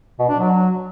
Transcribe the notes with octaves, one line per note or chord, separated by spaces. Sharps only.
B2
D4
F#3